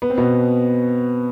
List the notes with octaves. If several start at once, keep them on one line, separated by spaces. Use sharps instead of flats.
B3
C4
B2 B3